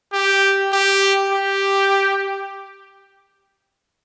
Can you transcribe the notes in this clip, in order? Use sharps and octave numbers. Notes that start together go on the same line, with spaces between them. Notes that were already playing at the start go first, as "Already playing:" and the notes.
G4
G4
G4